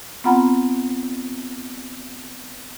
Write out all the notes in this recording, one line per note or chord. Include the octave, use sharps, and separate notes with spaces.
B3 C4 F4 F#5 A#5 B5